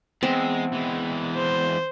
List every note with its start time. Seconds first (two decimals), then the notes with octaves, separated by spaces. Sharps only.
0.23 E2 G#3 C4
0.73 E3 G#3
1.35 C5